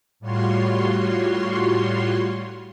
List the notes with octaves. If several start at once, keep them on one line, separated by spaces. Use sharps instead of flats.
A2 G3 F4 F#4 C#5 C6